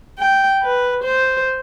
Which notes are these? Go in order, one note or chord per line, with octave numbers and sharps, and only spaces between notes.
G5
B4
C5